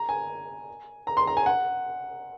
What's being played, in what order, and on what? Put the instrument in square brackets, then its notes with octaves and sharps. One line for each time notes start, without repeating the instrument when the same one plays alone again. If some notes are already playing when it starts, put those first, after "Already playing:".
Already playing: [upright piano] A#5
G#5
A#5
C6
A#5
G#5
F#5